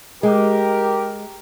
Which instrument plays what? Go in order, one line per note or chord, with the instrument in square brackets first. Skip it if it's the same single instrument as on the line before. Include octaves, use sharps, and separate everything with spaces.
[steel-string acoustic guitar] G#3 [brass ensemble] G4 A#4